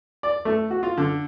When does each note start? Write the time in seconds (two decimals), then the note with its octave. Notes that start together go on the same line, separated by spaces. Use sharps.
0.23 D5
0.45 A3
0.71 F#4
0.83 F4
0.98 D3